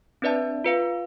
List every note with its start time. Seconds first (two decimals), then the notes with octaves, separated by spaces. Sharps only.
0.22 C4 D4 B4 D5 E5 A5
0.64 F4 B4 F5